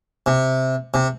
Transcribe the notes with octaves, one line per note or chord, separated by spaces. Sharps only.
C3
C3